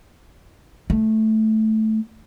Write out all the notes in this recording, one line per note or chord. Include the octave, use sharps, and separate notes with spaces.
A3